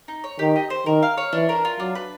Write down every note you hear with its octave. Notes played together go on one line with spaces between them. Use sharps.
D#4
C#5
D#3 G4
D#5
C5
D#3 A#4
F5
C#5
E3 D4
A#4
F4
F#3 D4
B4